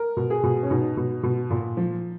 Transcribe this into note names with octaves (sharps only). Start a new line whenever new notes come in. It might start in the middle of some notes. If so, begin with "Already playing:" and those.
Already playing: A#4
B2
G#4
B2
C#4
B2 D#4
B2
B2
A#2
F3